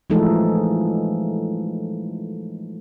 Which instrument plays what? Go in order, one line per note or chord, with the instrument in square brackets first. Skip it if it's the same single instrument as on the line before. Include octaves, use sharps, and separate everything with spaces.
[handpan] E3 F3 G#3 A3 D#4 A4